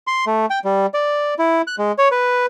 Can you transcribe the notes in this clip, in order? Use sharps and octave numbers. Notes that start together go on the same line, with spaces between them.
C6
A3
G5
G3
D5
E4
F#6
G#3
C#5
B4